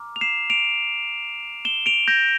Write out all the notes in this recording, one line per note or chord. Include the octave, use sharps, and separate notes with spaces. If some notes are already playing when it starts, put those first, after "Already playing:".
Already playing: A#5 D6 F6
F7
C7 E7
D7 F7
E7 G7
D7 F7
G6 A#6